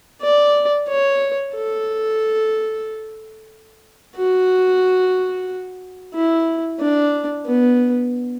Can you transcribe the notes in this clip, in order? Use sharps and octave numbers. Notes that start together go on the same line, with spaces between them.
D5
C#5
A4
F#4
E4
D4
B3